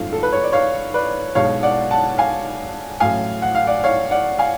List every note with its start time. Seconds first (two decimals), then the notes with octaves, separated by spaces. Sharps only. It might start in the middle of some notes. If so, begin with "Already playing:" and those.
Already playing: G#1 F#2 F3 A3 F5
0.13 A4
0.23 B4
0.32 C#5
0.43 D5
0.52 C#5 F5
0.94 B4 D5
1.35 B1 B2 G#3 C#5 F5
1.63 D5 F#5
1.91 F#5 A5
2.18 F5 G#5
3.00 A1 A2 F#3 A3 F5 G#5
3.42 F#5
3.55 F5
3.67 D5 F#5
3.84 C#5 F5
4.11 D5 F#5
4.39 F5 G#5